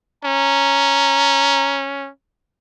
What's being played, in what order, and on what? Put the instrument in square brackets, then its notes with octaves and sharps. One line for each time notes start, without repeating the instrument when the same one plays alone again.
[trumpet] C#4 [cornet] A#5